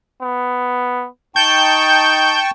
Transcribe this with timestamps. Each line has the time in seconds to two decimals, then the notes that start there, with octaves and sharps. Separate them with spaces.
0.22 B3
1.36 D#4 G5 A5 C#6 G6